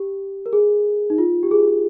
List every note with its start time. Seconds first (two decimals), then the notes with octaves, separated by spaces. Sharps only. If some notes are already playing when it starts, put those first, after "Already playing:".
Already playing: G4
0.46 A#4
0.53 G#4
1.10 D#4
1.18 F4
1.43 G4
1.51 G#4
1.68 G#4